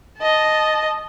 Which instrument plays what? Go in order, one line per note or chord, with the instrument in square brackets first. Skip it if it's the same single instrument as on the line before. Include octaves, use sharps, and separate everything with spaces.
[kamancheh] D#5 A5